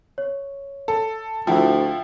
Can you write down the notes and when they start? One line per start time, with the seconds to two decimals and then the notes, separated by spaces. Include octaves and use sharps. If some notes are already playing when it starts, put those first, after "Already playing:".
0.18 C#5
0.88 A4
1.47 D2 F3 E4 E5 F#5 G5